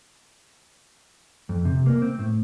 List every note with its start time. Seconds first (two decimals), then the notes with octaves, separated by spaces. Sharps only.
1.49 F2
1.65 C3
1.86 A#3
2.02 C4
2.19 A2